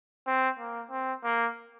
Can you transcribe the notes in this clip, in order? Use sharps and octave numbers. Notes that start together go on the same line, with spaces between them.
C4
A#3
C4
A#3